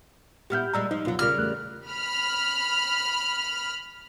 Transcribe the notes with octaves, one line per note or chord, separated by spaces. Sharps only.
A#2 B3 E4 G4 F6 G6
A#2 G3 G#3 A#5 E6
F3 D#4
C#2 F#2 B2 F#3 F4
C#3 G3 A#4 F6
E2 A3 F#6
B5 F6